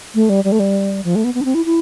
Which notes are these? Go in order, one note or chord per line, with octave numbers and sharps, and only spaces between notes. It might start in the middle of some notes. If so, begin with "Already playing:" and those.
A3
G3
G3
A3
G3
F3
A3
B3
B3
D4
C4
E4
E4